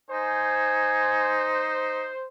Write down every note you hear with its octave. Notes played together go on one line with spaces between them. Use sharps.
D#4 C5 G#5